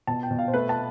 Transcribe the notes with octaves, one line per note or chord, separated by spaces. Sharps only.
B2 A5
G5
B2
F5
C5
A3 B4
A5